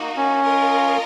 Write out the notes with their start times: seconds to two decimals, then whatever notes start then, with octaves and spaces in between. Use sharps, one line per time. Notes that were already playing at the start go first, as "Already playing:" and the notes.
Already playing: A#3 D#4 F#4
0.17 C#4
0.42 F4 A#4 D#5